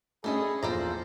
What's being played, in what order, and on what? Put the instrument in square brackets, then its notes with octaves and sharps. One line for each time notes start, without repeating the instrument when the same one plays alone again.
[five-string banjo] G3 A4 D#5 [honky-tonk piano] A3 C#4 D4 [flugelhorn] G#4 [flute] B5
[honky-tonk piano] A#1 E2 [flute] F4 [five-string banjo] A4 D5 A#5 [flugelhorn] C5